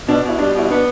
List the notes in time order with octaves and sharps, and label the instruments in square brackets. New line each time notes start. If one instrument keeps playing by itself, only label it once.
[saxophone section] B2 [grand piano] D4
[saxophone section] B2
[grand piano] E4
[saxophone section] G3 [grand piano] D4
[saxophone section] B2 [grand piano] E4
[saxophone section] B3 [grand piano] D4